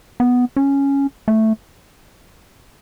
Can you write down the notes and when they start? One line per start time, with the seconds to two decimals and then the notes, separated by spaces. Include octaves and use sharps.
0.20 B3
0.57 C#4
1.28 A3